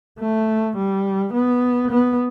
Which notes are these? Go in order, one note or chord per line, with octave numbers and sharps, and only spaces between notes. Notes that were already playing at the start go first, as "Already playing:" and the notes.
A3
G3
B3
B3